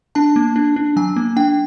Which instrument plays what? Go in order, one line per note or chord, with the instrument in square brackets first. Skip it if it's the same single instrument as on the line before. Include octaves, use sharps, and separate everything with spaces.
[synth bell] D4 A5
A#3
D4
D4
F#3 G#5
A#3
D4 G5